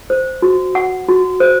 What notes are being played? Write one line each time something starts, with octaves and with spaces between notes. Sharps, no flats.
C5
F#4
F#5
F#4
C5